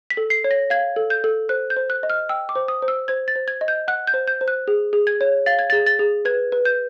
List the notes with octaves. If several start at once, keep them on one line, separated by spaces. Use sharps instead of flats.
B6
A4
C7
C#5
A#6
F5 G#6
A4
G6
A4
C5 F#6
G6
C5
F#6
D#5
F6
G5 E6
D6
C5
D#6
C5
E6
C5 G#6
A6
C5
G#6
D#5
G6
F#5 F#6
G6
C5
G6
C5
F#6
G#4
G#4
G#6
C#5
F5 A6
G#6
G#4 A6
A6
G#4
B4 G#6
B4
G6